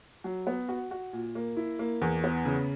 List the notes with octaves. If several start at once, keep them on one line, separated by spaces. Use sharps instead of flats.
F#3
B3
F#4
F#4
A#2
A#3
E4
A#3
E2
B3
C#3